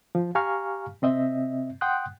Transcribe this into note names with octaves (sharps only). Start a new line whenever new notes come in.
F3
G4 F5 G#5 A#5 C#6 F6
C3 C4 D#5 E5
F#5 G5 C6 D#6 F#6